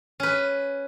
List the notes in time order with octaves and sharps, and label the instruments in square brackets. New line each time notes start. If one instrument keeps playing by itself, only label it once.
[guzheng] C#4 B4